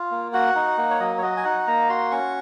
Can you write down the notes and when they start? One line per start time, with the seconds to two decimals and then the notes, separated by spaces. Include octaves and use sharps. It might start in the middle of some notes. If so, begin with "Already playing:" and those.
Already playing: F4
0.11 A#3
0.33 F#4 F#5
0.56 D#4
0.78 A#3
0.91 C#5
1.00 F#3 D#5
1.18 C#5
1.22 F#4 D#5
1.37 G#5
1.45 D#4 F#5
1.67 A#3 A#5
1.89 F#4 C6
2.11 C#4 C#6